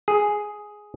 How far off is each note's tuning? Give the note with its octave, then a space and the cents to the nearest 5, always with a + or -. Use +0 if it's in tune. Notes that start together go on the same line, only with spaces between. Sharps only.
G#4 +5